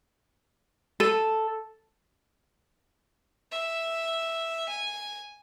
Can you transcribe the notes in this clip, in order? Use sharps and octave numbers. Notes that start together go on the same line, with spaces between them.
A4
E5
G#5